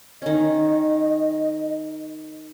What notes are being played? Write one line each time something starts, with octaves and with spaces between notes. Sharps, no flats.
D#3 C#4 D#5